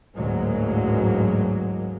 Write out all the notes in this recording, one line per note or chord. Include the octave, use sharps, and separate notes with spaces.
A1 D2 G#2 F#3 G#3 A#3